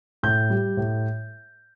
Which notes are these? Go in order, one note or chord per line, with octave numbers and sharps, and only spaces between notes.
A2 G6
G3
A2